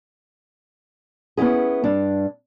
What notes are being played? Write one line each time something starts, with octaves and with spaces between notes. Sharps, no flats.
B3 C#4 D#4 E4 G#4
G2 D4